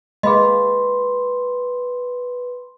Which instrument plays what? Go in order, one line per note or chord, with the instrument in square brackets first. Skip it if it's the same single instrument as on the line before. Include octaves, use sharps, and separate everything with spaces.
[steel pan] G#3 A#3 F5 [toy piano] G#4 D#5 [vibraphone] B4 [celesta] B5 C6